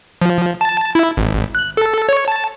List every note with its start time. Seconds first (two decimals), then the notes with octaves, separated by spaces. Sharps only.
0.22 F3
0.61 A5
0.95 E4
1.17 G#1
1.55 F#6
1.77 A4
2.09 C#5
2.28 A5